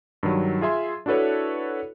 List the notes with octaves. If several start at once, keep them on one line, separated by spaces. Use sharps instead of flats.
G2 D#3 F#3
F4 G#4 E5 C6
D4 E4 F#4 A4 B4 C#5